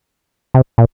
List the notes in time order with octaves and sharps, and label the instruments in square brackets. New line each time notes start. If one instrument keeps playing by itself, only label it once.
[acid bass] C3
A#2